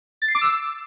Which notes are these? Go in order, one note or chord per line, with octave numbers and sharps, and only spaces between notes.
A6
C7
D6
E6